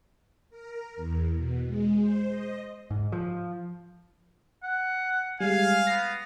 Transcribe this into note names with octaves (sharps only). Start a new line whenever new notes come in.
A#4
E2
B2
G#3
C5
D#5
G#2
F3
F#5
G3 G#3 F5 G#5
B3 A#6